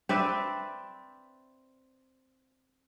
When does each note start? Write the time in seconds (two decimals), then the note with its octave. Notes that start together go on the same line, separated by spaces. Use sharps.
0.09 C4 B4 D5 E5